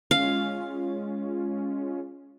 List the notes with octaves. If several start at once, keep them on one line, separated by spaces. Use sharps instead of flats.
G#3 C#4 F4 F5